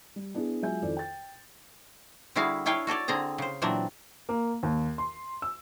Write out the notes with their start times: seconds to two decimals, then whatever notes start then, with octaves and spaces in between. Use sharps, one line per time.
0.16 G3
0.35 B3 D4 E4 G#4
0.62 F#3 G#3 F4 E5 G#5 G6
0.82 F2 D#3 E4 A4 D5
0.97 G5 A6
2.35 D3 G3 E4 F#4 G#4 F5
2.66 D4 E4 C#5 F5 G5 G#5
2.87 F#4 A4 C#5 D5
3.08 D3 C4 G#4 A#5
3.38 C#3 C5
3.62 A#2 E3 F#3 C4 D4
4.29 A#3
4.63 D#2
4.98 C6
5.42 E6